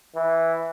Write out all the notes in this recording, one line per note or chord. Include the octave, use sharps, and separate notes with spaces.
E3